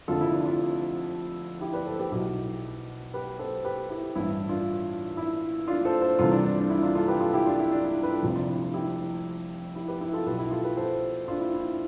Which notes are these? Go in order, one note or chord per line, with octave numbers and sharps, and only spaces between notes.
F1 F2 D3 F4 A4
E4
D4
D4 F4
E4 G4
B4 D5
A4 C5
G4 B4
B1 B2 E4 G4
G4 B4
A4 C5
G4 B4
E4 G4
A1 G2 E3 E4
D4 F4
E4
D4 F4
A4 C5
A4 C5
C2 C3 E3 F4 A4
D4 F4
D4
D4
E4
D4 F4
F4 A4
G4 B4
F4 A4
E4 G4
D4 F4
E4
D4
E4
B4
F4 A4
F1 F2 C3
D4 F4
E4
E4 G4
E4 G4
G4 B4
E4
F4 A4
B1 B2 G4 B4
E4 G4
F4 A4
G4 B4
A4 C5
D4 F4
E4
E4
E4